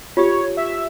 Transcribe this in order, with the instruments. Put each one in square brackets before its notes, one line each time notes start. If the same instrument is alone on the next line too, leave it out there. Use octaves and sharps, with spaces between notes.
[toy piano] F4 G4 [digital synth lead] C#5
[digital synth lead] E5